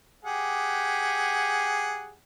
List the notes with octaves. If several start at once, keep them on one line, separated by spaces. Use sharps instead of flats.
G4 G#4 F#5